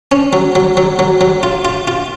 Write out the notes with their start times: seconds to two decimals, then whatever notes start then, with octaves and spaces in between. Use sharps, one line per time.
0.12 C#4
0.33 F#3
0.55 F#3
0.77 F#3
0.99 F#3
1.21 F#3
1.43 F4
1.65 F4
1.88 F4